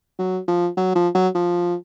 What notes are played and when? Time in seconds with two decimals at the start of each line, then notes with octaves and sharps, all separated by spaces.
0.19 F#3
0.48 F3
0.77 F#3
0.95 F3
1.15 F#3
1.35 F3